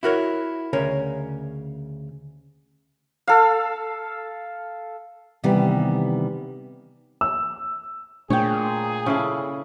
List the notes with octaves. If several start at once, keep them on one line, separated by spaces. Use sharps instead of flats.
E4 F#4 A#4 C#5
D2 C#3 A#4 C#5
A4 F5
C3 D#3 E3 G3 B3
E6
A#2 A3 D4 G#4 C#5 G5
C#3 E4 A4